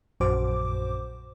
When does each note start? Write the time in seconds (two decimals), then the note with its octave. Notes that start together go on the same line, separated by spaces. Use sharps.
0.20 A#1 F#2 F#4 C5 D6